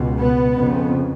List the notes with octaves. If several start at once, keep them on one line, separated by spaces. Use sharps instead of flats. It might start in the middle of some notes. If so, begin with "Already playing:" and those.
Already playing: C#2 B2
B3
F2 C#3